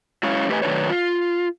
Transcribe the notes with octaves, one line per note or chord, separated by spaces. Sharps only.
F#3 G#3 C#4 E4 C#5 F5
A3 G4 B4 C#5 D#5 G#5
D#3 F#3 A3 D4 B4 C#5
F4